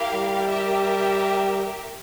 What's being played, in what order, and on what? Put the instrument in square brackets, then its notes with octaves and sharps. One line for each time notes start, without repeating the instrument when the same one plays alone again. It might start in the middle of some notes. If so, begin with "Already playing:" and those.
Already playing: [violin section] E4 G4 A#4 F5
[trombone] G3
[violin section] G4 A#4 E5